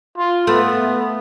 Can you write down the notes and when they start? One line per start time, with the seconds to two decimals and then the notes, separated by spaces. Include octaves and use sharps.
0.17 F4
0.47 A3 B3